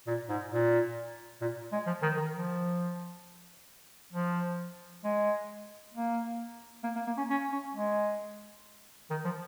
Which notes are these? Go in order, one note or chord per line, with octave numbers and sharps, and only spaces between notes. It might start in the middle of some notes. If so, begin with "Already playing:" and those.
A#2
G#2
A#2
A#2
G#3
F3
D#3
D#3
F3
F3
G#3
A#3
A#3
A#3
A#3
C#4
C#4
C#4
G#3
D#3
F3